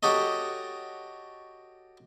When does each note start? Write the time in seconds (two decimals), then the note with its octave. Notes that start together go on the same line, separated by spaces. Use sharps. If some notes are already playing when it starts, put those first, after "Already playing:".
0.03 F#4 G4 A4 C#5 D#5